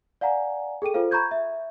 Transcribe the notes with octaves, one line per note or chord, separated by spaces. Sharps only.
D5 F5 F#5 G#5 A#5
G#4 A4 G5 D#7
F4 A4 C5 F5
A#5 B5 C#6 G6 G#6
E5